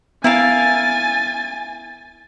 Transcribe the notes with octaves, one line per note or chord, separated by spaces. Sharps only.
B3 E4 A#4 F5 G#5 A6